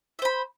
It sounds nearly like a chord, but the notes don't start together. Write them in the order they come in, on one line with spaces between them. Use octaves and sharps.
E5 C5 B5